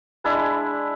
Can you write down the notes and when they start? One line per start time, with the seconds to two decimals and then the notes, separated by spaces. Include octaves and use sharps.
0.24 G#3 D4 E4 B5